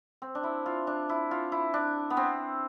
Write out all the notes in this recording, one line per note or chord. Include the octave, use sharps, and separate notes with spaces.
C4
D4
E4
F4
D4
E4
F4
E4
D4
B3
C4